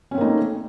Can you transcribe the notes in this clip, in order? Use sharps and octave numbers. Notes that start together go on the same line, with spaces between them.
A3 A#3 C4 C#4 D#4